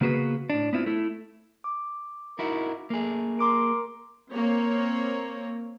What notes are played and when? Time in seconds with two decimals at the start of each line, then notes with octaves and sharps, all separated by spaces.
0.01 C#3 A#3 B3 F#4 G#4 B4
0.50 A2 D4
0.73 B3 C4 E4 F4
0.86 A3 E4
1.64 D6
2.39 D#4 E4 F#4 A#4
2.90 A3 A#3 G#4
3.39 A#4 C6 D6 D7
4.32 A#3 C4 C#5